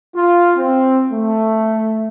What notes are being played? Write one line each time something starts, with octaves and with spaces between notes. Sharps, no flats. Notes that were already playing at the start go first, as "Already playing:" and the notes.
F4
C4
A3